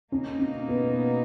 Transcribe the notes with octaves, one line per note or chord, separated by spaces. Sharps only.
B2 A#3 C#4 D#4
C#4
B3